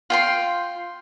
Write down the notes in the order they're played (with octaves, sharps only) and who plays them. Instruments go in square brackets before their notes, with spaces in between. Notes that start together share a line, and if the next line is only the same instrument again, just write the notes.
[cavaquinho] F4 G5 C6